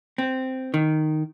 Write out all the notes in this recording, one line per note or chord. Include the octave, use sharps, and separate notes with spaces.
C4
D#3